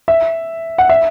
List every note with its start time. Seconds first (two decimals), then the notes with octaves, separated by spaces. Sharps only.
0.08 E5
0.78 F#5
0.89 E5